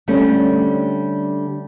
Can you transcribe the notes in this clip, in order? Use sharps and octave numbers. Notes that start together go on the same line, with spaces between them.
D3 G3 A3 C4 C#4